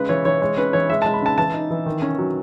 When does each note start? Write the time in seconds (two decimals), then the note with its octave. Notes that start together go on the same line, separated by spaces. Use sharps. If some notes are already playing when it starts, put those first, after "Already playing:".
Already playing: C#3 G#3 B4
0.09 E3 C#5
0.25 E3 C#5
0.42 G#3 C#5
0.57 C#4 B4
0.73 E3 C#5
0.89 G#3 E5
1.02 G#3 A5
1.14 B5
1.22 C#3 A5
1.38 E3 A5
1.54 D#4
1.71 E3
1.86 D#3
2.02 C#4
2.18 F#3